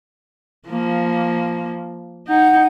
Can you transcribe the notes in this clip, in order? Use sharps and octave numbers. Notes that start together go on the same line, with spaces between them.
F3 A#3
D#4 F#5 G6